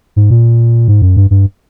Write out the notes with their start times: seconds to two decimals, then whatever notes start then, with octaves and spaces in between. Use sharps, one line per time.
0.16 G#2
0.30 A#2
0.88 G#2
1.02 F#2
1.17 G2
1.31 G2